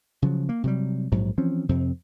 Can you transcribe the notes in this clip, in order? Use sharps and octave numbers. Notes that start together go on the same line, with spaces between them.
C#3 F3 F#3
A#3
C3 F#3 G3
A#1 G#2 F#3
E3 F3 C4 C#4
F2 C3 C4